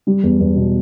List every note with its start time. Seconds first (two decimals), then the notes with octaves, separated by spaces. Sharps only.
0.07 G3
0.23 E2
0.40 E2
0.56 B2